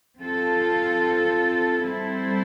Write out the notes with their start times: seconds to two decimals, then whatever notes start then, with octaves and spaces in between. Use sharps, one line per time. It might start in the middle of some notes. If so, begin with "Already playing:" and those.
0.19 C4 F4 A4
1.84 G3 C4 E4 A4 C5